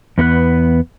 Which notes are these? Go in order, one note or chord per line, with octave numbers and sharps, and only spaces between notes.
E2 B3 D#4 B4